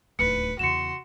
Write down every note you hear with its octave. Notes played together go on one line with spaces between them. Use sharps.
D1 D#2 B4 C#7
E2 C#3 F#4 C6 C#7 E7